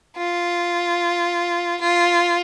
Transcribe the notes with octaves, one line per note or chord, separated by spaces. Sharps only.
F4
F4